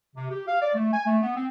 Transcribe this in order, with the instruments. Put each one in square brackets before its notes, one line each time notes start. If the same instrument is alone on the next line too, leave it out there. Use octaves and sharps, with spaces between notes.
[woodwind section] C3
G4
F5
D5
A3
G#5
A3
B3
C4